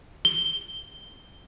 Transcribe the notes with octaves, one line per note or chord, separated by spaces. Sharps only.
G7